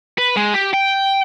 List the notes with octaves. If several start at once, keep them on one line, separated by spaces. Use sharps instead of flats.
B4
G#3
G4
G5